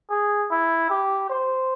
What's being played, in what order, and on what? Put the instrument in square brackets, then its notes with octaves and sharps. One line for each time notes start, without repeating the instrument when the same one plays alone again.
[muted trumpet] G#4
E4
G4
C5